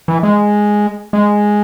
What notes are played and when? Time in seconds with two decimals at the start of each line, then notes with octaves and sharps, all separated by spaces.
0.08 E3
0.23 G#3
1.13 G#3